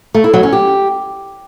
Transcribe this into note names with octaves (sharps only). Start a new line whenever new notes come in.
A3
E4
F#3
C#4
G4